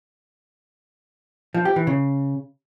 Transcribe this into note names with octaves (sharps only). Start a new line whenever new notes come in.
F3
G4
E3
C#3